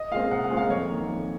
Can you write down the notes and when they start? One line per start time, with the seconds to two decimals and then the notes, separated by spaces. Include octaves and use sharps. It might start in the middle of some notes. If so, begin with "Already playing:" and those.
Already playing: D#5
0.11 A#2 G#3 C4 F5
0.31 C2 F#5
0.44 F#5
0.50 A#2 G#3 C4
0.57 F5
0.70 F2 C#5
0.89 D#3 A#3
1.08 F2